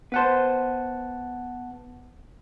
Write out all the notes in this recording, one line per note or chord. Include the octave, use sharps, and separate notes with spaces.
B3 B4 C5 F#5 A5